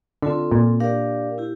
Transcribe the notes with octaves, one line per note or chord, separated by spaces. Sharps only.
D3 C4 F4 A4
A#2
D4 G4 A#4 D5 F5
E4 G4